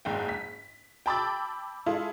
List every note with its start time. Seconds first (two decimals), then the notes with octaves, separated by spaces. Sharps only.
0.05 F#1 G#2 G5
0.29 B6
1.06 G5 A5 B5 D6 E6 A6
1.86 G#3 E4 F4 G#4 A4